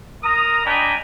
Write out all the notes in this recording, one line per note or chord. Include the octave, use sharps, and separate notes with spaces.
A#4 A#5 D#6
D4 D#5 G5 G#5 A#5 B5